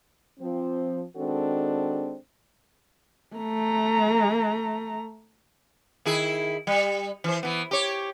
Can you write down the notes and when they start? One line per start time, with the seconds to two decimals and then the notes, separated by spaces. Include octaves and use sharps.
0.40 F3 C4
1.16 D#3 G#3 C4 D4 F#4 A4
3.36 A3 A#5
6.05 D#3 E4 G#4
6.67 G3
7.24 E3 C5
7.43 E3 B3
7.71 G4 C#5